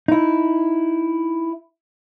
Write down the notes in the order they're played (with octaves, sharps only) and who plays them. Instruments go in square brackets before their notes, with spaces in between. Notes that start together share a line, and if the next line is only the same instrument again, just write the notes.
[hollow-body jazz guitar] D#4 E4